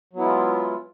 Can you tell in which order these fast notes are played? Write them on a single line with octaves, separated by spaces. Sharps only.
F#3 B3 E4 G#3 F4